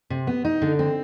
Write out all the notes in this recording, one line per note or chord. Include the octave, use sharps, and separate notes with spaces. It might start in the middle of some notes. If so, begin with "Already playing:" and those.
C3
B3
D#4
D3
C4